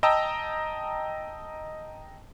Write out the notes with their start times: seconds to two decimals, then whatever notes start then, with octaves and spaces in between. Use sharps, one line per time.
0.03 D#5 G5 A5 A#5 E6